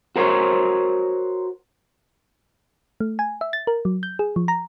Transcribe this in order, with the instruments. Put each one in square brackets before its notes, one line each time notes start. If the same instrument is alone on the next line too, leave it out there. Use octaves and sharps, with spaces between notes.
[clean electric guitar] F#4 A#4 C5 C#5
[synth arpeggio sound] A3
G#5
E5
A6
A#4
F#3
G6
G#4
F3
A#5